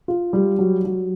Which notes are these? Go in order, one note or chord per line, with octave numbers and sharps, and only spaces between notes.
F4
G3
F#3
F#3